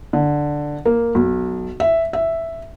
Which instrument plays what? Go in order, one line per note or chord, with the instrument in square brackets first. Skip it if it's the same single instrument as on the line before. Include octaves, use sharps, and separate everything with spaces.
[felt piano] D3
A#3
B1
E5
E5